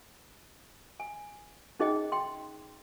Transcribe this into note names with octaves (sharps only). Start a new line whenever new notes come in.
G#5
C#4 D#4 G#4 C5 D#5 G5
G5 C6